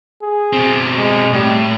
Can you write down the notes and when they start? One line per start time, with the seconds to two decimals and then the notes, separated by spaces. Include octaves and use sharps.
0.23 G#4
0.53 B2 C4
0.98 G#3
1.33 A2 G3